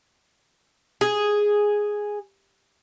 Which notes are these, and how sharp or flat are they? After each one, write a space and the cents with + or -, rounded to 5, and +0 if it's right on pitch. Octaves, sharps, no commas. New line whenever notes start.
G#4 +0